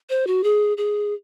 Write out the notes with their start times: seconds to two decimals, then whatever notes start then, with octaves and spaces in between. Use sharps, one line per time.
0.10 C5
0.27 F#4
0.44 G#4
0.77 G#4